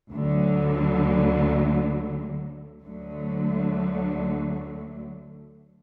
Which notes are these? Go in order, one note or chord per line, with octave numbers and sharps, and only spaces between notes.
D2 D3 F#3
D2 D3 F#3 A3